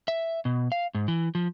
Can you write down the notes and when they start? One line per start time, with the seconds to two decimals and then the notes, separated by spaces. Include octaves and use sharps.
0.08 E5
0.45 B2
0.72 F5
0.95 G#2
1.08 E3
1.35 F3